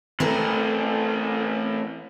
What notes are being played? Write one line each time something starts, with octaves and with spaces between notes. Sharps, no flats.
E3 A3 C4 A#4 C5